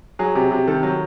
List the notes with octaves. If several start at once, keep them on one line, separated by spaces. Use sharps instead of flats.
F#3 G#4
C3
C3
D#3 A4
F#3